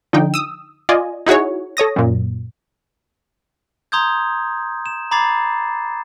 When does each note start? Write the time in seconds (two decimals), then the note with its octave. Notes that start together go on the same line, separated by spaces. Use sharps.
0.13 D3 F3 D#4 G5
0.34 D#6 E6
0.89 F4 D5 D#5 G#5
1.26 D#4 E4 F#4 G#4 C#5
1.77 A4 C#5 D#6 A#6
1.96 F#2 A#2
3.92 A#5 C6 D#6 G6 G#6
4.86 E7
5.11 A#5 B5 D6 G#6 A6 C7